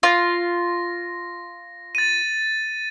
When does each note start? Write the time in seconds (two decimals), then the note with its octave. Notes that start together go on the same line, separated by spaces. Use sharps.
0.03 F4 A#6
1.95 A6 D#7